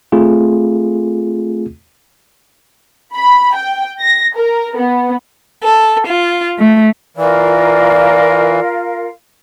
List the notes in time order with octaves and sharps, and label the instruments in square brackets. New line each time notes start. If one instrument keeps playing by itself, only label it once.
[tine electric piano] A3 C4 F4 G#4
[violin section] B5
G5
A#6
A#4
B3
[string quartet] A4
F4
A3
[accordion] E3 [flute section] F4 A#4 F5 [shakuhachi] D5